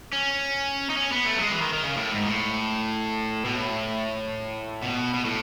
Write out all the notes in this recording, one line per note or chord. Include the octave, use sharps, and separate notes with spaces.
C#4
D#4
C#4
B3
A3
F#3
G#3
E3
D#3
D#3
C#3
A2
G#2
A2
B2
A2
B2
B2
A2